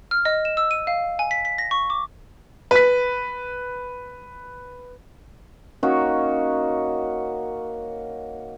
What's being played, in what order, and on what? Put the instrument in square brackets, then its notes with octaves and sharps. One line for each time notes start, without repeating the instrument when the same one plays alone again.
[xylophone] F6
D#5
E7
E6
D#7
F5
G#5
B6
B6
A#6
C#6
D6
[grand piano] B4 B6
[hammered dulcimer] A#3 C#4 D#4 F#4